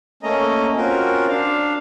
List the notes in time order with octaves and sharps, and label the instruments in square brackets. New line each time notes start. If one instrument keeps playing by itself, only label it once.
[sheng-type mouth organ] A3 A#3 C#4 D#5 A#5
C4 C#4 F4 F#4 A#4
D4 F5